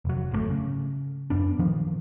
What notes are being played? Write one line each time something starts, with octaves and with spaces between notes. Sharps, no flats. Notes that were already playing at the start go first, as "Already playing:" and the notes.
F1 F#3
G#1 C3 A3
C#3
F#2 B3 D4
A#2 D#3 F3